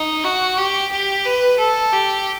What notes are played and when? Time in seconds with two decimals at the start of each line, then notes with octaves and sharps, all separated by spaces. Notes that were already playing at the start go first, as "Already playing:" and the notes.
Already playing: D#4
0.24 F#4
0.58 G4
0.92 G4
1.25 B4
1.59 A4
1.92 G4